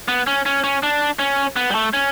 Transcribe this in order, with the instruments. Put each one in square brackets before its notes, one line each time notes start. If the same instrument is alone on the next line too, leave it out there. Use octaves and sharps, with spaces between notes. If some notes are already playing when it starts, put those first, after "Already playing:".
[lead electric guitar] B3
C#4
C#4
C#4
D4
C#4
B3
G3
A3
C#4